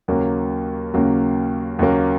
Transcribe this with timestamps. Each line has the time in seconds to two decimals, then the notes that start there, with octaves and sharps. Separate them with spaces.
0.08 D#2 C#3 F#3 A#3
0.94 D#2 C#3 F#3 A#3
1.79 D#2 C#3 F#3 A#3